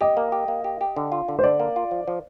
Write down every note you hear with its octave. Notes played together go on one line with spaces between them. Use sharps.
G4 D#5
A#3
G4
A#3
G4
G4
D3
F4
D3
C5
D3 D5
A#3
F4
F3
F3